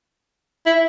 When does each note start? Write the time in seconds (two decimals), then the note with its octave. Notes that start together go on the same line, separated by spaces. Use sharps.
0.66 E4